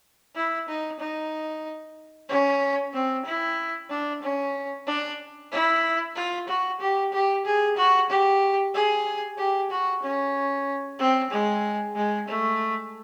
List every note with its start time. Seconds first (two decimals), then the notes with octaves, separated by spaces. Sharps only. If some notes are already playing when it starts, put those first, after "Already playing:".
0.36 E4
0.68 D#4
0.99 D#4
2.29 C#4
2.94 C4
3.25 E4
3.90 D4
4.22 C#4
4.87 D4
5.52 E4
6.16 F4
6.48 F#4
6.80 G4
7.13 G4
7.45 G#4
7.76 F#4
8.09 G4
8.74 G#4
9.37 G4
9.71 F#4
10.03 C#4
10.99 C4
11.31 G#3
11.96 G#3
12.28 A3